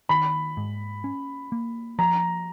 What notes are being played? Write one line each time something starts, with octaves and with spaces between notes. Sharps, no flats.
D#3 B5
G#2
C#4
A#3
F3 A#5